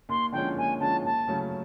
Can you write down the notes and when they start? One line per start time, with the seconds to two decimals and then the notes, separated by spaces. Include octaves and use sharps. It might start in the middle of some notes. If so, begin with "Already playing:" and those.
0.09 D#2 C6
0.32 D3 F3 G#3 C#4 G5
0.56 D#2 G#5
0.80 D3 F3 G#3 C#4 A5
1.04 D#2 A5
1.28 C#3 F#3 A3 C#4